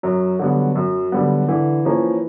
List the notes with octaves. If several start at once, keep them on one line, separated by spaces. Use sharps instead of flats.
F#2 F#3
D3 G3 B3
F#2
D3 G3 B3
D3 E3
F3 A#3 C#4